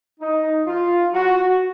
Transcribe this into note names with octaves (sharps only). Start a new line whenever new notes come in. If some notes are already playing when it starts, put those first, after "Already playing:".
D#4
F4
F#4